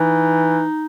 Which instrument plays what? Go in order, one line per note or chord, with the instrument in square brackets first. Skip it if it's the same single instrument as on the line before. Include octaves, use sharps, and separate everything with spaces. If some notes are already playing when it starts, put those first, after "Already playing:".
Already playing: [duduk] E3 [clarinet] D#4